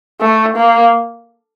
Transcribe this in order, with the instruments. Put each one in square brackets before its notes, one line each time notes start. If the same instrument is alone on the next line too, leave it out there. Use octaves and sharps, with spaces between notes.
[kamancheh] A3
A#3